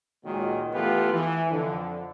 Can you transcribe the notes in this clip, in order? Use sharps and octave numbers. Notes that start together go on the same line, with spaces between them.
C#2 A#2 D#3 F#3 G#3
E3 A3 B3 F4 G4 B4
E3
F2 D3